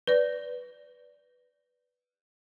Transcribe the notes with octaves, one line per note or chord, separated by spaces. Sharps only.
B4 D5